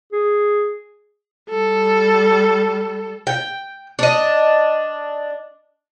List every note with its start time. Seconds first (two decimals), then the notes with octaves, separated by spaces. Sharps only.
0.12 G#4
1.50 G3 A4
3.27 G5
3.99 D4 D#5